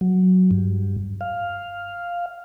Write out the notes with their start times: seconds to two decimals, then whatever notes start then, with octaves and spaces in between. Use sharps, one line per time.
0.01 F#3
0.51 G2
1.21 F5